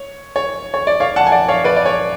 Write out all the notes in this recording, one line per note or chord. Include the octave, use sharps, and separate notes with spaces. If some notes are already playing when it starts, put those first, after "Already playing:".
Already playing: C#5
C#5
C#5
D5
C#5 F5
F#5 A5
G#5
D5 F#5
C#5 F5
B4 D5
D5
C#5